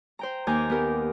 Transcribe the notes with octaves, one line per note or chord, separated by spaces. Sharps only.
C5 G5 A#5
D#2 G#5 A#5 D6 G6
B3 G4 A#4